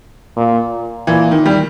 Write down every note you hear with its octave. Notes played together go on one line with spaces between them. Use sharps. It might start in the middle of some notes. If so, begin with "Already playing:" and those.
A#2
A#2 E3
D#3
G3